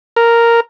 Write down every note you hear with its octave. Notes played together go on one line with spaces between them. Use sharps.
A#4